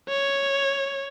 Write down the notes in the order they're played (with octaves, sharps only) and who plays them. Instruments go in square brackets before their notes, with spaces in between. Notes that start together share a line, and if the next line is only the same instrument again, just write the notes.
[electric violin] C#5